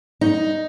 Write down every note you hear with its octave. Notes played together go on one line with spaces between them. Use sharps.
D#4